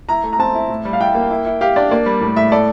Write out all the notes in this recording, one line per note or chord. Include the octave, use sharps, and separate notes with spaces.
E4 A#5
A3
A#5
C4 A5
E4
A2
G3
F5
E4 G5
A#3
E4
E4
G4 F5
D4 D5
A#3 D5
G3
A2
A2 E5
A4 D5